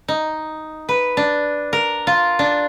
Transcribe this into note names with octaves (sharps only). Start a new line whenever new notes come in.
D#4
B4
D4
A#4
F4
D4